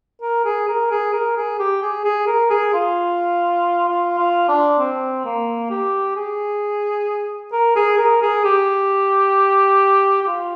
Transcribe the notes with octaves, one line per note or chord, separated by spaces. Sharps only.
A#4
G#4
A#4
G#4
A#4
G#4
G4
G#4
G#4
A#4
G#4
F4
F4
F4
D4
C4
A#3
G4
G#4
A#4
G#4
A#4
G#4
G4
G4
F4